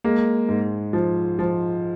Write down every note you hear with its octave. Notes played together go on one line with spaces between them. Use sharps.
G#3 A#3
G#2
F3
F3